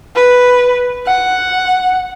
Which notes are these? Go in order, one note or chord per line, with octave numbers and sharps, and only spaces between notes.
B4
F#5